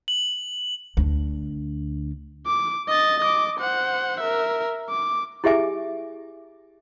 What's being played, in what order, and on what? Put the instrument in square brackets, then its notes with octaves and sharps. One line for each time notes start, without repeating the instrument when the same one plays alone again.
[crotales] F#7
[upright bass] D2 D4
[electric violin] D6
D#5 A6
D#5 D6
C5 F#5
A#4 E5
D6
[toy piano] E4 G4 G#4 E5 G#5 D6